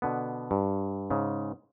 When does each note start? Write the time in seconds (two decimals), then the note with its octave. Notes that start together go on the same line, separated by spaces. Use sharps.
0.02 B2 D3 B3
0.51 G2
1.10 G#2 C#3